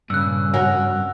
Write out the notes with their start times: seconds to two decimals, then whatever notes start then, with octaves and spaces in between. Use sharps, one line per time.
0.10 G2 A#2 C#3 E6 F#6
0.54 F2 C#4 F#4 A#4